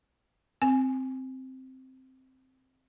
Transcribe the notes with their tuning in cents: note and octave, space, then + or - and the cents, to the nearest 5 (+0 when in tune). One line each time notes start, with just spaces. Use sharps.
C4 +0 G#5 +0